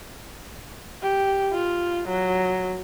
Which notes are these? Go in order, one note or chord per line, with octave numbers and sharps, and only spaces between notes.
G4
F4
F#3